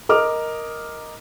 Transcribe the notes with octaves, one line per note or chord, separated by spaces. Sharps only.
A#4 D#5 D6 D#6 F6